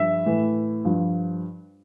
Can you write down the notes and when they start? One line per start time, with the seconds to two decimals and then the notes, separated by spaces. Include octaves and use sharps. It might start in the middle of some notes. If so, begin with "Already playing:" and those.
Already playing: G2 F3 E5
0.26 A2 E3
0.85 G2 F3